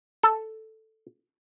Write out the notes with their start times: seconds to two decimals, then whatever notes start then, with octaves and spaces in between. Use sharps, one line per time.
0.23 A4